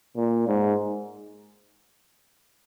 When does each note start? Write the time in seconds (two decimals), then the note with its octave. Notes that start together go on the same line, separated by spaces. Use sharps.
0.16 A#2
0.47 G#2